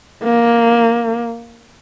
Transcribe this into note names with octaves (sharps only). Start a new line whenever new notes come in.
A#3